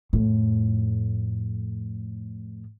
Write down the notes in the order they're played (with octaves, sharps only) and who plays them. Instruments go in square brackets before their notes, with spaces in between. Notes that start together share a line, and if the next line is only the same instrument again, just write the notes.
[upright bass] F2 A2